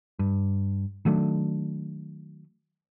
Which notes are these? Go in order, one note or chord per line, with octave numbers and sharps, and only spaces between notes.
G2
D#3 F#3 A3 D4